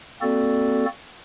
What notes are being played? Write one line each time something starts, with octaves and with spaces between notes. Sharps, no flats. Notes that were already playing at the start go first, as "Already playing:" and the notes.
A#3 C4 F#4 A4 D5